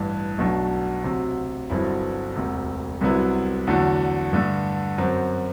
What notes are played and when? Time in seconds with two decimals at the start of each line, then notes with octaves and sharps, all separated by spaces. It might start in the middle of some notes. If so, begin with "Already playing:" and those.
Already playing: A1 G2 E3
0.38 B1 B2 A3 D4
1.04 D2 C3 F#3
1.70 G1 G2 F#3 C4 E4
2.36 E1 D2 C3
3.01 C2 C3 F#3 B3 E4
3.67 E2 D3 F#3 A3
4.33 G2 D3 A3
4.98 F#2 F#3 C4